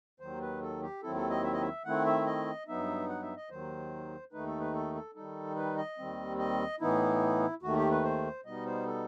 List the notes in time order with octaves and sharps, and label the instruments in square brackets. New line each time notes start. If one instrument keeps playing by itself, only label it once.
[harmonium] D#2 D#3 F#3 C5
B4
A4
G4
D#2 D#3 F#3 C4 E4 A4
A4
D#5
E5
D#5
E5
D#3 A3 C4 E4 F#5
E5
D#5
G2 F#3 B3 D#4 E5
F#5
E5
D#5
D#2 D#3 F#3 C5
D#2 D#3 A3 D#4 B4
A4
B4
A4
A4
D#3 G3 D#4 A4
B4
D#5
D#2 D#3 G3 C4
D#5
A2 E3 B3 D#4 E4
D#2 D#3 A3 F#4
G4
B4
C5
B2 G3 B3 D#4 D#5
C5
A4